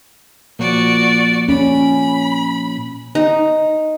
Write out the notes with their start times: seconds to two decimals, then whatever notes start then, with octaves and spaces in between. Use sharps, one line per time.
0.59 A#2 F3 F#4 D5
1.49 C#4 B5
3.15 D#4